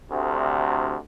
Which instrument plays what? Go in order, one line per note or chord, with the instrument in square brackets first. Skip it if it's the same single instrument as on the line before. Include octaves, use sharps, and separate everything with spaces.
[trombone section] D2 C3